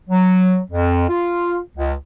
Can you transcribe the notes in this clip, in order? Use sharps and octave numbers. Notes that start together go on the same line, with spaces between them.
F#3
F2
F4
C#2